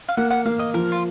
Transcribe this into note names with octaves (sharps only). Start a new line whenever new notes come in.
F5
A#3 F#5
F#5
A#3 F5
D#5
F3 A#4
F4